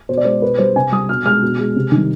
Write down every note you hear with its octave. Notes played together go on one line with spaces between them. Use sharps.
B2 C5
D5
G#3 C5
B2 B4
G3 C5
C3 G#5
G3 D#6
B2 F6
G#3 F6
B2
G#3
C3
D#3
G3